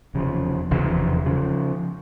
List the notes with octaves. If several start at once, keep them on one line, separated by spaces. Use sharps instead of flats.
F1 E2 C#3 F3
F1 E2 C#3 F3
C#3 F3